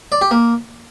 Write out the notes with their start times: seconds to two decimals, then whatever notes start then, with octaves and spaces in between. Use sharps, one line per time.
0.12 D5
0.22 G4
0.31 A#3